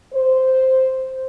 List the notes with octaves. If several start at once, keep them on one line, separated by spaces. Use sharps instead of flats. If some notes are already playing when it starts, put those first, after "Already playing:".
C5